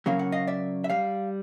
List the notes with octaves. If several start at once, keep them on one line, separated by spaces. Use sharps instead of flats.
C#3 F#3 A#3 C#4 F5
F#5
D#5 F5
D5 E5
E5
G3 F5